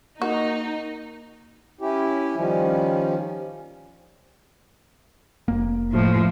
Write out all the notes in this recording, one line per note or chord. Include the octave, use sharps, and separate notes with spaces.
A#3 D#4 F#4
C#4 E4 G4
D#3 F3 G3 C#4
F1 A#3
A2 F3